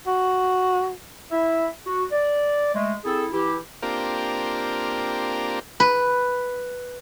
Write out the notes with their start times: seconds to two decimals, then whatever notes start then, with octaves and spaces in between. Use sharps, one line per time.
0.07 F#4
1.31 E4 E5
1.85 F#4
2.11 D5
2.74 G#3 A3
3.05 C4 E4 G#4 A4
3.32 E3 E4 G4
3.82 A#3 C4 D4 F4 G4 A#4
5.80 B4